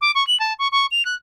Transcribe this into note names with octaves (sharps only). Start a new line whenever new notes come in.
D6
C#6
F#7
A5
C#6
C#6
F7
F#6